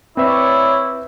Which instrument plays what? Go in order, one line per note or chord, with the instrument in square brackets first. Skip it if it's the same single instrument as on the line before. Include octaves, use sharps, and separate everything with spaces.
[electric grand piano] C4 B4 E5 [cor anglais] E4 [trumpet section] C#5 D5